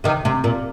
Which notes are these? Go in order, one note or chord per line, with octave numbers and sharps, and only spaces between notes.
C3 D#3
C3
A#2